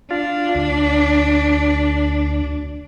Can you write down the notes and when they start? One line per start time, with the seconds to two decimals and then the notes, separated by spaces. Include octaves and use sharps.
0.11 D4 F4
0.55 D2